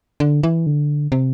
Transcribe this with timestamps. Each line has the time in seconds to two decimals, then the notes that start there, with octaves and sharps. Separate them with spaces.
0.20 D3
0.43 E3
0.66 D3
1.12 C3